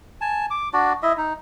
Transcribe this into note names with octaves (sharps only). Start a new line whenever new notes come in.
G#5 A5
D6
D4 F#4 D5
E4 D#5 E5
D#4